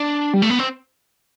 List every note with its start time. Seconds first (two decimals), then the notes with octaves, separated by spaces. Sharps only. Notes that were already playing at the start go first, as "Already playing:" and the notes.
Already playing: D4
0.34 G3
0.42 A3
0.50 B3
0.59 C4